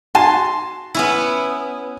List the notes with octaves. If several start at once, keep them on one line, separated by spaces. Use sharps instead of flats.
F#4 G#5 A5 C6
B3 C#4 E4